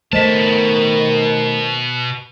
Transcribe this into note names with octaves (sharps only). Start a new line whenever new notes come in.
B2 D#3 A3 C5 D#5 A5 B6